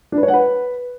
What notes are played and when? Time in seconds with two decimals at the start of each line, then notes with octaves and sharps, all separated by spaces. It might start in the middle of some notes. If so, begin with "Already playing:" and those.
0.12 D4
0.18 B4
0.23 C#5
0.28 F#5
0.34 B4